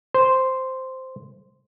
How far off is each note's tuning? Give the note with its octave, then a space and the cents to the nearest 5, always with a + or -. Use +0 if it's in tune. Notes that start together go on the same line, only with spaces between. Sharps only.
C5 -5